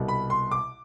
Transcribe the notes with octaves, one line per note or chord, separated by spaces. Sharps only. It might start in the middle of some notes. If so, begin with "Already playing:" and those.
Already playing: C2 B2 G3
B5
C6
D6